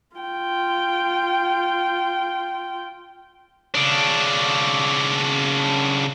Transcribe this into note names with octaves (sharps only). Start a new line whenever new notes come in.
F4 G5
C#3 D4